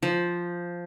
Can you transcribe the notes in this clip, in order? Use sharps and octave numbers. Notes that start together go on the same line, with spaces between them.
F3